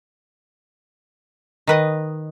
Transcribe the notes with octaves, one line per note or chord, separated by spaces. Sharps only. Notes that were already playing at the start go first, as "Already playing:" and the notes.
D#3 B4 D#5